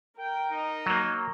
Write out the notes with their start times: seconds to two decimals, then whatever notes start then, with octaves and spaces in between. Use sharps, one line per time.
0.18 A#4 G5
0.51 D#4
0.86 F#3 A#3